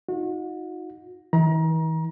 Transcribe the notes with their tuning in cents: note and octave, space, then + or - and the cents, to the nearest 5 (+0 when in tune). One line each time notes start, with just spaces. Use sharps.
D#4 +25 F#4 -35
E3 -45 A#5 +30